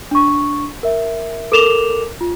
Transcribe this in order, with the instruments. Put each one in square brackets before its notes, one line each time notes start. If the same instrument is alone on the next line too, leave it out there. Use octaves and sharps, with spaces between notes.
[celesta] D4 C#6
A#4 E5
A4 A#4 D6 E7 F7 G7
F4